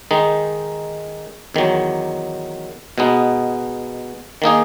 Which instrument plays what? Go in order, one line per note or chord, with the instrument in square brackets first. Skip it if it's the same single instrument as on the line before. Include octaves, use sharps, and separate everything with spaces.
[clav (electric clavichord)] D#3 G#3 D#4
E2 D#3 F#3
B2 G#3 B3 D#4
D#3 A#3 D#4 G#4